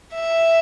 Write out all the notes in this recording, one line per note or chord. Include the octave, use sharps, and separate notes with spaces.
E5